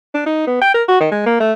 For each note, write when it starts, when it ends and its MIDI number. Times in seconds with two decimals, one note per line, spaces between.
0.14 0.23 62
0.26 0.46 63
0.47 0.61 59
0.62 0.72 79
0.75 0.83 70
0.88 0.98 66
1.00 1.10 51
1.12 1.26 56
1.26 1.38 58
1.40 1.53 57